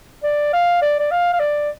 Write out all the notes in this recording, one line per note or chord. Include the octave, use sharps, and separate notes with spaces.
D5
F5
D5
D5
F5
F5
D5